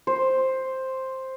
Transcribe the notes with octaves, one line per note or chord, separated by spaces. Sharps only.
C5